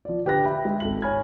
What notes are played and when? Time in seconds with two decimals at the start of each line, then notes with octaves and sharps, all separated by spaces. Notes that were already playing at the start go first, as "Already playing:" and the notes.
0.05 F3 D5
0.25 D3 G4 B4 F#6 A#6
0.45 E5 G5 B5
0.65 G#3 E5
0.80 G#1 A4 F#7
1.02 C#5 G#5 B5 F6 G#6